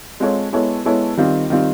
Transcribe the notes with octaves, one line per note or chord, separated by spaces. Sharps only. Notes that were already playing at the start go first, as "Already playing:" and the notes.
G#3 C4 F4 A4 C#5
G#3 B3 E4 A4 C#5
G#3 B3 E4 A4 C#5
D#3 G3 C4 F4
D#3 G3 C4 F4